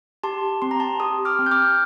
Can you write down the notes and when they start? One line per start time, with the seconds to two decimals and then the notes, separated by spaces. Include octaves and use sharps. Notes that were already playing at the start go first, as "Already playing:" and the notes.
0.24 G4 A5 C6
0.62 C4 C6
0.71 A#5
0.80 A5 C6
1.00 G4 C6 D#6
1.25 D6 F6
1.39 C4
1.46 G6
1.51 D6 F6